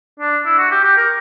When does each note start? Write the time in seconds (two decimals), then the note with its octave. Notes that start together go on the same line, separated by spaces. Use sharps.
0.20 D4
0.45 E4
0.58 F#4
0.71 G4
0.84 G4
0.97 A#4